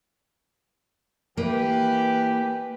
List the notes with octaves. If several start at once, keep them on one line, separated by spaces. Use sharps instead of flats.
E3 A#3 G4 B4